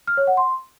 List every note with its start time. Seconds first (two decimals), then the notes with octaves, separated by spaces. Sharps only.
0.07 F6
0.17 C#5
0.27 F#5
0.37 C6